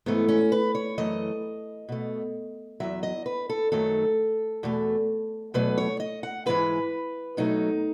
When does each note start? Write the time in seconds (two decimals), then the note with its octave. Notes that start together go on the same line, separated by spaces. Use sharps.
0.06 G#2 E3 A3 B3
0.28 C#4
0.52 B4
0.75 C#5
0.98 F#2 E3 A3 D#5
1.89 B2 A3
2.80 E2 B2 F#3 E5
3.03 D#5
3.26 B4
3.50 A4
3.72 F#2 D#3 F#3 A3 A4
4.63 E2 B2 A3
5.54 E2 B2 F#3 A3 B4
5.78 C#5
6.00 D#5
6.23 F#5
6.46 G#2 E3 G#3 B4
7.37 B2 F#3 A3 D#4